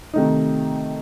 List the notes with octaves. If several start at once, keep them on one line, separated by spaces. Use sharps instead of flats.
C3 D#3 A3 D#4